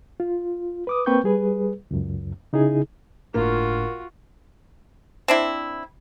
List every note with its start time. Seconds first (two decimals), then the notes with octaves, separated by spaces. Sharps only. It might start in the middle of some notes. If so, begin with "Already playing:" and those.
0.20 F4
0.87 B4 D6 D#6
1.06 A#3 C4 B4 G5 C#6 G6
1.24 G3 G#4 B4
1.91 C#2 F#2
2.53 C#3 D#4 E4 G#4
3.34 G1 A2 A#3 D4 F4 F#4
5.28 C4 D4 E4